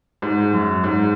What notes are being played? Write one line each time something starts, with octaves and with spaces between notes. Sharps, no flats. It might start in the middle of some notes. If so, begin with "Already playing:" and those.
G#2
F#2
G#2